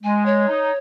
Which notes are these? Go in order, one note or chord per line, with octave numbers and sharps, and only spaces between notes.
G#3 G#5
C#5
D#4